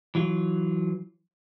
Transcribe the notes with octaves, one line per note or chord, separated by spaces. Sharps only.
E3 F#3 F4